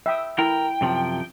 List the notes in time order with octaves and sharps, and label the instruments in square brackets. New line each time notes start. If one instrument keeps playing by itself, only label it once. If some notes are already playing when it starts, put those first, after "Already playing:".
[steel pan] E5 G5 D#6
[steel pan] E4 [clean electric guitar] A#4 [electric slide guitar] G5
[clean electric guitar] F#2 C3 F3